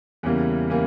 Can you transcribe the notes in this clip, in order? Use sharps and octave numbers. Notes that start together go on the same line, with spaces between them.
E2 C#3 E3 G3 A#3
C#3 E3 G3 A#3